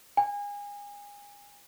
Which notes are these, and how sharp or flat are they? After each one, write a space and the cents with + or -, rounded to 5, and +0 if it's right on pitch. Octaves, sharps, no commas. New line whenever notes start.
G#5 -30